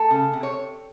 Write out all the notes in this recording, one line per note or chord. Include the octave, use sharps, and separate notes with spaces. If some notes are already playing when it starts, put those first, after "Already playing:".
Already playing: A3 A4
C#3
C3
C#5